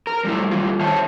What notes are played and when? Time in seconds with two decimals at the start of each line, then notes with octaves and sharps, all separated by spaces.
0.07 A#4
0.24 G3 A3 E4
0.51 D#3 G3 A#3 F4
0.81 C5 C#5 E5 A5